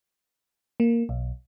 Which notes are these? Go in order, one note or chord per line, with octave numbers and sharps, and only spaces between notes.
A#3
B1